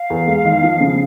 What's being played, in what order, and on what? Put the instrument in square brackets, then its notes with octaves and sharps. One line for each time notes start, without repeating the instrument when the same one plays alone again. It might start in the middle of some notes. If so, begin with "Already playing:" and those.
Already playing: [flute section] F5
[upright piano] E2
G#3
D#3
F3
C#3